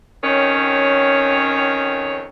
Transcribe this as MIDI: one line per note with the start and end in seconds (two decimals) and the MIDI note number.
0.23 2.26 41
0.23 2.26 51
0.23 2.26 61
0.23 2.26 73